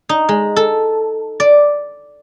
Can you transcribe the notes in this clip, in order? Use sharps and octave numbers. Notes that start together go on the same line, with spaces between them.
D#4
G#3
A4
D5